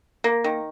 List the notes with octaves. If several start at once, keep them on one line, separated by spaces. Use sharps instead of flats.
A#3
D#3